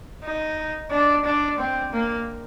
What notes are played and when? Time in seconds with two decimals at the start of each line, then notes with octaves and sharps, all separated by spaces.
0.24 D#4
0.91 D4
1.25 D4
1.58 C4
1.92 A#3